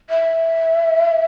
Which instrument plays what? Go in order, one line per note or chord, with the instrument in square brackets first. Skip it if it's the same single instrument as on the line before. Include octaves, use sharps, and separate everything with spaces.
[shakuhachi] E5